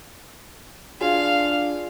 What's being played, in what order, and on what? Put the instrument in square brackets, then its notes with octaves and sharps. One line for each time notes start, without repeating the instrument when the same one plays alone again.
[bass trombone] D4 [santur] F4 G#4 [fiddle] F5